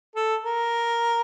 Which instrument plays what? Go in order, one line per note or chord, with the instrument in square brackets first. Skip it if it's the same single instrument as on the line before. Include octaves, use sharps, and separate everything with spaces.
[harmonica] A4
A#4